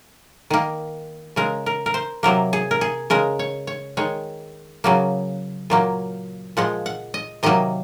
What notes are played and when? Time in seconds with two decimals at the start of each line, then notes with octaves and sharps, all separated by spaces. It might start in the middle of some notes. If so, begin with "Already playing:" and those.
0.50 D#3 A#3
1.36 C#3 G#3 A#4
1.66 A#4
1.86 A#4
1.94 C5
2.23 C3 F#3 A#3 A#4
2.53 G#4
2.71 A#4
2.81 G#4
3.10 C#3 G#3 A#4
3.39 C#5
3.67 C#5
3.97 D#3 G#3 C#5
4.84 C#3 F#3 A#3
5.70 A#2 F#3 A#3
6.57 A#2 F3 G#3 F#5
6.86 F#5
7.14 D#5
7.43 C3 D#3 F#3 A#3 D#5